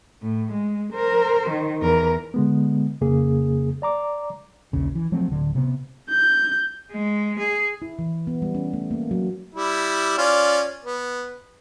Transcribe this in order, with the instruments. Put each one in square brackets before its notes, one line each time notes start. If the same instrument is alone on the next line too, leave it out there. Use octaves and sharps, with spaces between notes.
[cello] A2
G#3
A#4 C5
D#3
E2 A#4
[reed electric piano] D3 G#3 B3
F2 C#3 A#3 G#4
D5 A#5 D6
[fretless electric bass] A#1 D#2 C#3
E3
F3 F#3 A3 C4
D1 D3
C3 B3
[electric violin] G6
[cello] G#3
G#4
[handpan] E4
E3
B3
G3
C#4
A3
A#3
F#3
[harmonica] G3 E4
C#4 F4 D5
B3